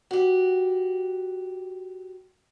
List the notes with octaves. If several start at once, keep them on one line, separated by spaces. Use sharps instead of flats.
F#4 G4